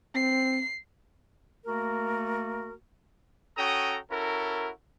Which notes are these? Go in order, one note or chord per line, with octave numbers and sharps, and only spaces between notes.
C4 C7
A3 A#3 F#4 A#4
C#4 F#4 A4 G5 A#5 D#6
C#4 E4 F#4 A4 A#4